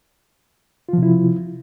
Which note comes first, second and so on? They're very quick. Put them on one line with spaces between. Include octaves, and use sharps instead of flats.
F4 F3 C3 E4